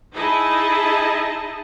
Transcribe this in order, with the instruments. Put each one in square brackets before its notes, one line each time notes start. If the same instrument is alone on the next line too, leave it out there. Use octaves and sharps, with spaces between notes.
[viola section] D#4 E4 G#4 D#5 A5